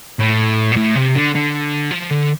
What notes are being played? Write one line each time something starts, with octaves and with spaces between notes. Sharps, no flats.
A2
A#2
A2
C3
D3
D3
F3
D3